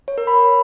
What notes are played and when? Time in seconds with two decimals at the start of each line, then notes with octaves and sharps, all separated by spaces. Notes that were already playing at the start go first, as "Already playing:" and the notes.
0.08 C#5
0.18 A#4
0.27 B5